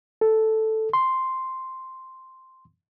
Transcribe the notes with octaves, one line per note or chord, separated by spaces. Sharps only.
A4
C6